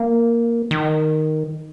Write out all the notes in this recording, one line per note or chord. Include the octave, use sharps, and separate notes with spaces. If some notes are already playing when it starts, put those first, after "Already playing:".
Already playing: A#3
D#3